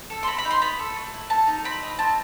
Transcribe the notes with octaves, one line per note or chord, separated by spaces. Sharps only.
A4
C6
C4 B5
B5
D#4
C6
B3 B5
A4
A3
E4
A4 A5
D#4
C4 B5
D#4
C4 A5